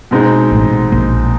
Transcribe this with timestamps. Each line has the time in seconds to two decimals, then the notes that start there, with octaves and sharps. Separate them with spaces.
0.11 B2 G#3 C4 D#4
0.51 A1 A2
0.92 A#1 A#2